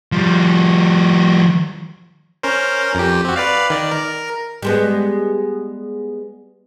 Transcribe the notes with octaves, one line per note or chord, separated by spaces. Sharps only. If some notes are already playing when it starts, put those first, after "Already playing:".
F3 G3
C#4 A#4 C5
F2 G4
C4 F#4
B4 D5 F5
D#3 D5
A#4
G3 G#3 B3